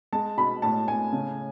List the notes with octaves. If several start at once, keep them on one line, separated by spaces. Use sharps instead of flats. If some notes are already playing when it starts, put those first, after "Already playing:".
G#3 A5
B2 B5
A2 A5
A2 G#5
C#3